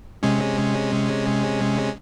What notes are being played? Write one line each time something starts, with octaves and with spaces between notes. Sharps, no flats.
C3 G#3 C#4